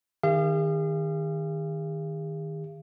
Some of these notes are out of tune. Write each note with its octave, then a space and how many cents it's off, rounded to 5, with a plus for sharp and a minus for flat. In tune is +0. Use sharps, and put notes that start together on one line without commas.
D#3 +0 G#4 -45 F5 -35